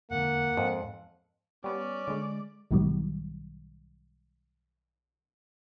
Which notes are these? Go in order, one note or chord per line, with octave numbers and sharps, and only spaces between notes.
E1 F2 D3 A#3 F#5
F2 G#2
G3 B3 C#4 D5
D3 G#3
B1 G#2 B2 D#3 F#3 G3